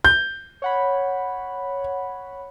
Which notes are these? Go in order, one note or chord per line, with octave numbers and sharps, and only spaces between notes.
G6
C#5 F#5 B5